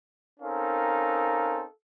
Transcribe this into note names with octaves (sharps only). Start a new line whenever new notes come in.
C4 C#4 D#4 A4 A#4 F5